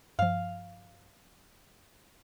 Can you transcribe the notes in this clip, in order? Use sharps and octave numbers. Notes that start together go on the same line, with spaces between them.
G2 F3 F5